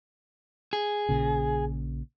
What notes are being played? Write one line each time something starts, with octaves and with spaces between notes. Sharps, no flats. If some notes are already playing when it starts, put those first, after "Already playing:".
G#4
A#1 A#2 C#3